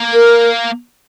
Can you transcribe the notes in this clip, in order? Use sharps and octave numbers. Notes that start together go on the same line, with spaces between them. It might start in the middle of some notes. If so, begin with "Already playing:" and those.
Already playing: A#3
A#4